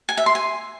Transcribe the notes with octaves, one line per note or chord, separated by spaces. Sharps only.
G#5
E5
C6
G#5